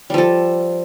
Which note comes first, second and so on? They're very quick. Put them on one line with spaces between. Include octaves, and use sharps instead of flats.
G3 F3 A4